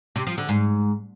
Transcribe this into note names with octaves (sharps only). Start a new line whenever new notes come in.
C3
F3
D3
G#2